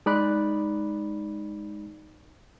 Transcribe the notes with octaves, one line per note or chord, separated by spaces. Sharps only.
G#3 D#4 D5 B5 F#6